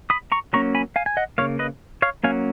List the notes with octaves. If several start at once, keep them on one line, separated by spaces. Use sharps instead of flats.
B5 D#6
A#5 C#6
F#3 A#3 C#4 A#5 C#6
G#5 B5
F5 G#5
G#5
D#5 F#5
C#3 F3 A#3 C#5 F5
B4 D#5
C#5 F5
F#3 A#3 C#4 F5 G#5